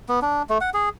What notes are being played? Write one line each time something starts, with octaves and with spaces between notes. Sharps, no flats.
B3
D4
A3
F#5
G#4